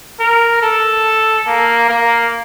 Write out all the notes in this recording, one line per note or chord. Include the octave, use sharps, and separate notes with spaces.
A#4
A4
A#3
A#3